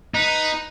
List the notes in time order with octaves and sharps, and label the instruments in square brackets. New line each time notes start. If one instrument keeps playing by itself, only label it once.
[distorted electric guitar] D#4 [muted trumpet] B4